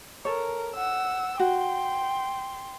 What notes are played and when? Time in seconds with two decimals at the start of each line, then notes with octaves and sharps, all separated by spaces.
0.25 A4 A#4 C#5
0.75 F#5 E6
1.39 F#4 G5 C6